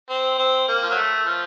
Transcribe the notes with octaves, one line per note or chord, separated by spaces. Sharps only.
C4
C4
A#3
F3
F#3
A3
F3